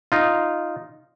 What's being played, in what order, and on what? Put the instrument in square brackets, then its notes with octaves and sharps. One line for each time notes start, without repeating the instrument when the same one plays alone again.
[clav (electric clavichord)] D#4 F4